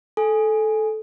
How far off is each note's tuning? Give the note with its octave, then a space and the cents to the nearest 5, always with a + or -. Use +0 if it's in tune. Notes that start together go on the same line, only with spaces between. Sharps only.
A4 -15 G#5 +0